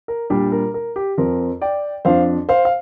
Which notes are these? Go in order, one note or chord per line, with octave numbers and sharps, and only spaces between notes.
A#4
A#2 G3 D4 G4
A#4
A#4
G4
F2 F3 C4 A#4
D5 G5
F2 F3 D4 C5 F5
C5 F5
F5